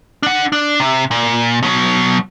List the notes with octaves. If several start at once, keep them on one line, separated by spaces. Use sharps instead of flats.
D4 F#5
D4
C3
A#2
B2 F#3